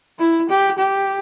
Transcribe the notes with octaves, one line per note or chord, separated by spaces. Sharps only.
E4
G4
G4